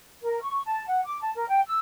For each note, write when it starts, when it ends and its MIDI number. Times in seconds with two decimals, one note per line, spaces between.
0.23 0.39 70
0.41 0.61 85
0.65 0.84 81
0.88 1.00 78
1.04 1.17 86
1.22 1.31 81
1.35 1.47 70
1.48 1.60 79
1.67 1.79 88